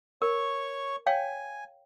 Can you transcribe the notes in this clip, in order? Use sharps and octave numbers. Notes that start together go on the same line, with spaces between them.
A#4 C#5 C#6
C#5 F5 G5 G#5